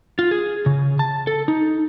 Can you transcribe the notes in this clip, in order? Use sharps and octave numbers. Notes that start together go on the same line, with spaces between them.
F4
G#4
C#3
A5
A4
D#4